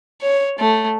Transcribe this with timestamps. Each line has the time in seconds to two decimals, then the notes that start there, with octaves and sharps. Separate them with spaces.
0.22 C#5
0.59 A3